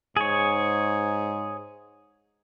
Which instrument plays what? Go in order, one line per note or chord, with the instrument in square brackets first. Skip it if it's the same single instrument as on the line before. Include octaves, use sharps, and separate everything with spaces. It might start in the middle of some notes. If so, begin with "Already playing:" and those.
[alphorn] G#2 [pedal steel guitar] G#4 C#5